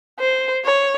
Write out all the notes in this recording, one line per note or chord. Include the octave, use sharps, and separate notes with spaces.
C5
C#5